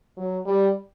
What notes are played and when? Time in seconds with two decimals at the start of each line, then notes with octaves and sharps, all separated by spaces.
0.17 F#3
0.46 G3